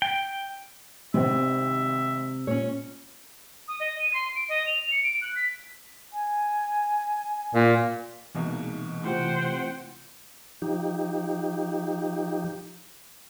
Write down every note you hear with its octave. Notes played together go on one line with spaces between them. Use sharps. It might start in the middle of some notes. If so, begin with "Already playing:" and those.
G5
G#1 C3 C4 E5
A#2 C#4 C#5
D#6
D#5
D#7
C6
D7
D#5
F7
C#7
D7
F#6
B6
G#5
A#2
C2 B2 E3 G#3 A#3 D#4
C3 E3 A3 E4 F4 C5 F#5 G5
F3 D#4 G4